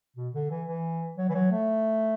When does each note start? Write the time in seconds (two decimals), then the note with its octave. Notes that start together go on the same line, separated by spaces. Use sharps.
0.16 B2
0.34 D3
0.50 E3
0.67 E3
1.17 F#3
1.29 E3
1.35 F#3
1.51 A3